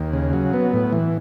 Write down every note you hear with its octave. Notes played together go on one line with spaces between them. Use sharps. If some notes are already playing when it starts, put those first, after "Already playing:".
Already playing: D#2
C#3
F#3
B3
A2
E3